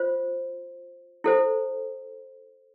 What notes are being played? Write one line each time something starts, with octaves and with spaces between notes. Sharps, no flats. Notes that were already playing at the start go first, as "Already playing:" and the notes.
Already playing: F4 C5
E4 A4 C5